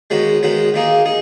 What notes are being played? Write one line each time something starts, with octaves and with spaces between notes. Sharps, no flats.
D#3 G#3 B3 F#4 C#5
D#3 G#3 B3 F#4 C#5
D#3 A#3 D#4 G#4
D#4 G#4